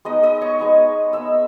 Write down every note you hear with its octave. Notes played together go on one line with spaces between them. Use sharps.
G#3 B3 D#4 D#5 D#6
D#5 D#6
C#5 C#6
G#3 B3 D#4
G#3 B3 D#4 E5 E6